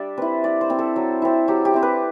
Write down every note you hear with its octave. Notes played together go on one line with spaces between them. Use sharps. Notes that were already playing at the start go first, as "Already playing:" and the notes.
Already playing: G3 D4 D5 E5
C4 E4 B4
G3 D5
C5
C4 E4
A4
F#3
C4 E4
F#3 G4
G4
C4 E4
B4